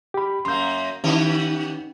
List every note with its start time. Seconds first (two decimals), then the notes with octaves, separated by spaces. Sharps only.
0.14 G4 B5
0.45 F#2 A#3 C6 G6
1.04 D#3 B3 C#4 D#4 G4